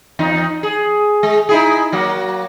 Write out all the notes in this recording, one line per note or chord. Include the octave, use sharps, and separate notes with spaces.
E2 D#4
G#4
G#3
D#4 E4 G#4
F#3 A#3 F#4